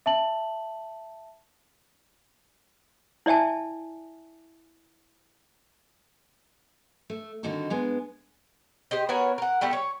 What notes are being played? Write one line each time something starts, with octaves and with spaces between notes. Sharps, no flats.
E5 A5 F#7
E4 D5 E5 G#5 A5
A3
D3 D#3 G3 C4 D#4 F#4
G2 G#3 B3
G4 C5 D#5
B3 F#4 A#4 C#5
A#4 F#5
G3 A3 B3 G4
C#5